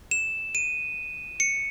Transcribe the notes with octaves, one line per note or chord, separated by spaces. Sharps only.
E7
D#7
C#7